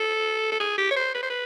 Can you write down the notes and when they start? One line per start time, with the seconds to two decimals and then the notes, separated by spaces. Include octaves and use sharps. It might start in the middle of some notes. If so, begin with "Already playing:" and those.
Already playing: A4
0.52 A4
0.60 G#4
0.78 G4
0.91 C#5
0.96 C5
1.15 B4
1.23 C5
1.30 B4